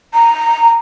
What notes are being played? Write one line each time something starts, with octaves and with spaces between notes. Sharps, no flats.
A#5